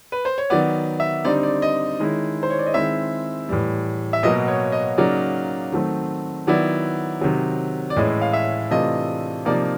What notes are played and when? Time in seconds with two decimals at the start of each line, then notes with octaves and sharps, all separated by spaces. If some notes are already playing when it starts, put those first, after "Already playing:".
0.12 B4
0.25 C5
0.38 C#5
0.50 D#3 F#3 B3 D5
1.00 E5
1.25 D3 G3 C4 D#4 D5
1.43 D5
1.62 D#5
2.00 D#3 G#3 C#4 E4
2.43 C5
2.50 C#5
2.59 D5
2.67 D#5
2.74 D#3 G#3 C4 E4 E5
3.49 A2 E3 G3
4.13 E5
4.23 B2 F#3 A#3 D#5
4.48 C#5
4.72 D#5
4.98 C#3 F#3 A#3 D#4 D5
5.72 D#3 F#3 A3 C4
6.47 D#3 F#3 B3 E4 D5
7.21 C3 D#3 F#3
7.90 D5
7.96 A2 E3 G#3 C#4 E4 D#5
8.21 F5
8.33 E5
8.71 C3 E3 A3 D4 F4 D#5
9.45 C3 F3 A#3 D#4 D5